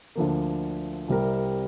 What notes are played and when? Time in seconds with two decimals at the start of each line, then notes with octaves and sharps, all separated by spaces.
0.15 D2 D3 F3 A#3
1.08 C2 C3 G3 C4 A#4